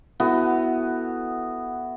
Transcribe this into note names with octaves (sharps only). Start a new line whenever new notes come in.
B3 E4 F#4 A4